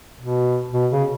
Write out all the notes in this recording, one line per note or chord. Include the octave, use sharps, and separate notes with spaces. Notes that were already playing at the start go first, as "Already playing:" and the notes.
B2
B2
C#3